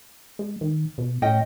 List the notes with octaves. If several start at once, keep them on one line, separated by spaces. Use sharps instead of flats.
G#3
D#3
B2
A2 C#4 D#5 G5